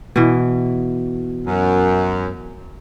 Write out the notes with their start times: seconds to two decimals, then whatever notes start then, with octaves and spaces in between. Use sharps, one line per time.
0.16 B2 E3
1.46 F#2